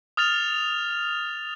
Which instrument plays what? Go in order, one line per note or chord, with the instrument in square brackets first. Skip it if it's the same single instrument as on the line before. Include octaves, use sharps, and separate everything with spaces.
[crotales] D#6 F6 A6 F7